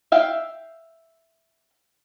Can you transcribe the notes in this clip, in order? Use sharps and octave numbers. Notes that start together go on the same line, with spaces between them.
E5 F5 G5